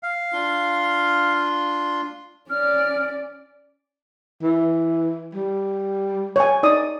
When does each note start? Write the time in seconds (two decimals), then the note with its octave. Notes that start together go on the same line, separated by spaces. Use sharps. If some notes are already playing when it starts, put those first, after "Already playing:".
0.03 F5
0.33 D4 F4 C6
2.50 C#4 D5 F6
4.43 E3
5.34 G3
6.36 C#5 G#5
6.63 D#4 D5 D#6